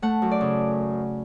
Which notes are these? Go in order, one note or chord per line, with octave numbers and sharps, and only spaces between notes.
A3 F#5
F#2
D5
C#3